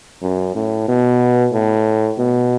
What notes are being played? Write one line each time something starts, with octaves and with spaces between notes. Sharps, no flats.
F#2
A2
B2
A2
B2